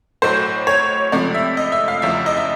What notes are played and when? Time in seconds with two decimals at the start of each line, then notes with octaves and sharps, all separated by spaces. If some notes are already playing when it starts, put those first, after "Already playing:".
0.22 B1 A2 F#3 A3 C5
0.67 C#5
1.12 C#2 C3 F3 A3 D5
1.34 E5
1.57 D#5
1.72 E5
1.88 F5
2.02 F1 E2 C#3 F3 E5
2.26 D#5
2.37 E5